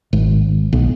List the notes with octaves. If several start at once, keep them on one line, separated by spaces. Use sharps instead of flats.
G#1
B1